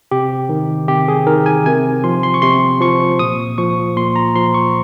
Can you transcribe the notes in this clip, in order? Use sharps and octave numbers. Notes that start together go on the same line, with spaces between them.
C3 G4
D#3
C3 G4
G#4
D#3 A#4
G#5
C3 G#5
F3 C6
C6
C#6
C3 C6
F3 C#6
A#2 D#6
F3 C#6
A#2 C6
A#5
F3 C6
C#6